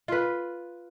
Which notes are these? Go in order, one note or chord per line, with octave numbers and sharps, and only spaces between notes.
F4 B4